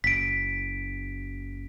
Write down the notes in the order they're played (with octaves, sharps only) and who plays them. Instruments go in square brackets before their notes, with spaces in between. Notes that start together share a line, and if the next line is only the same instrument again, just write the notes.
[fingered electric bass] F#1 [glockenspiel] B6 D7